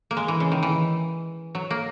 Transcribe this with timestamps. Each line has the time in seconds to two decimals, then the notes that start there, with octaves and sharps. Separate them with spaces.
0.11 A#3
0.17 G#3
0.28 E3
0.40 C#3
0.52 D#3
0.63 E3
1.55 F#3
1.71 A#3